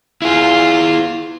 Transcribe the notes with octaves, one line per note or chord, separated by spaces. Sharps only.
E4 F4 G#4